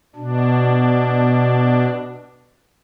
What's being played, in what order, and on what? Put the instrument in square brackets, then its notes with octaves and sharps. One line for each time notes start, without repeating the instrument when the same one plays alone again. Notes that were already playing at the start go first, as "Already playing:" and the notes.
[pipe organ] B2 D4